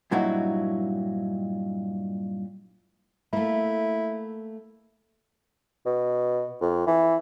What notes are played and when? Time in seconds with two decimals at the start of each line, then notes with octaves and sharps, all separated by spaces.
0.11 G2 A#2 F#3 D#4 E4 F#4
3.33 A3 A#3 E4
5.86 B2
6.61 F2
6.87 E3